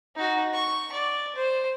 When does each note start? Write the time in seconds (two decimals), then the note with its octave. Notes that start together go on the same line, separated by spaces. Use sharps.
0.16 D#4 F#4
0.53 C#6
0.92 D5
1.35 C5